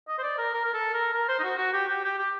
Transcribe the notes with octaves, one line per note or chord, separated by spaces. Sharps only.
D#5
C5
D5
A#4
A#4
A#4
A4
A#4
A#4
C5
D#4
F#4
F#4
G4
G4
G4
G4